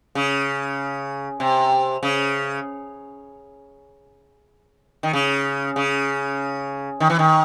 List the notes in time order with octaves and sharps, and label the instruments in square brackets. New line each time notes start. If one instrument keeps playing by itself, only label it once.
[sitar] C#3
C3
C#3
D#3
C#3
C#3
D#3
E3
D#3